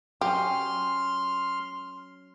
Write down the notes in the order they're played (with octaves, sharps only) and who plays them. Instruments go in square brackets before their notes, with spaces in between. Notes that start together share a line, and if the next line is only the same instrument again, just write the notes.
[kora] F#3 C#4 [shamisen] G4 [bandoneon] C6 F6